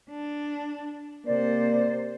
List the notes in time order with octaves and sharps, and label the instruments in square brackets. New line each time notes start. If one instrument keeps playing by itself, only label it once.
[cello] D4
[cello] C3 C5 [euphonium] A#3 [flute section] D5